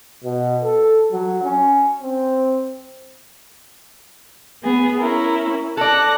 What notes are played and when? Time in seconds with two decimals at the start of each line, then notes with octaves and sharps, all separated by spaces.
0.24 B2
0.64 A4
1.12 F#3
1.44 C#4
2.02 C4
4.63 B3 G#4
4.99 C#4 E4 A#4
5.77 A4 D5 A5 F#6 A#6